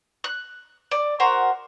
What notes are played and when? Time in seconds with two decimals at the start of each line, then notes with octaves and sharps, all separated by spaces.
0.24 F#6
0.92 D5
1.20 F#4 A#4 C5